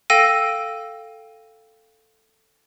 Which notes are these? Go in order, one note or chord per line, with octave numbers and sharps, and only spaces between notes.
A4 F5 G5 E6 A#6 D#7